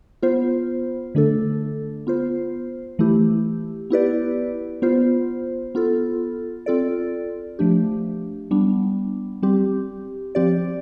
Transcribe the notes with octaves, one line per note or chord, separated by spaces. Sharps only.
B3 F4 C5
D3 A3 D4 A4
B3 F4 C5
E3 A3 E4 G4
B3 E4 G4 B4 D5
B3 F4 C5
B3 F4 A4
C4 F4 A4 D5
F3 A3 D4 G4
G3 B3 D4
G3 C4 G4
F3 C4 G4 D5